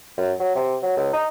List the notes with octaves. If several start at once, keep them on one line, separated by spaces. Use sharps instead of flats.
F#2
F#3
C3
F#3
C#2
D#4